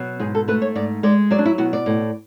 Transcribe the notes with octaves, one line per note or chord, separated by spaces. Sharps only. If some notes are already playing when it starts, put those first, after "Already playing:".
Already playing: B2 F#3
G#2 G#4
A4
A3 B4
C#5
G#2 D5
G#3 D5
F#3 D5
D4
E4
B2 F#4
D5
A2